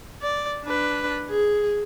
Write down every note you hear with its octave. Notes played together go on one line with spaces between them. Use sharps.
D5
D4 B4
G#4